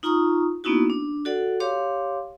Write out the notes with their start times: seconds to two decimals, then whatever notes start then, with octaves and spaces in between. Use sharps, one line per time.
0.03 D#4 F4 A#5 C#6 D#6
0.64 A#3 B3 C#4 D#4 E4 F#4
0.90 D4
1.25 F#4 A4 D5 F#5
1.60 G4 C#5 F5 C6 D6